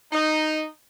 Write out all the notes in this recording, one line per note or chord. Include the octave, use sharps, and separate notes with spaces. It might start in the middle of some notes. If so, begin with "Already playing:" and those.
D#4